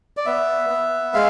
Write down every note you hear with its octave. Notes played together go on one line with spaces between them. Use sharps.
D5
B3 E5
B3
G#3 F5